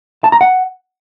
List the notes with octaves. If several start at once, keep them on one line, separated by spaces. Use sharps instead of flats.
A5
A#5
F#5